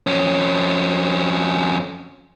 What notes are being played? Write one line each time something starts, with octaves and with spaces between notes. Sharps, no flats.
F2 C#4